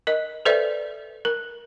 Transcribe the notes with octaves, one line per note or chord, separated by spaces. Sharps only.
A#4 D#5
A4 B4 C5 D5 E5
A#4